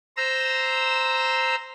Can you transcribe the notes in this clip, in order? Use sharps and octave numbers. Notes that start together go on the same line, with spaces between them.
C5 A#5 E6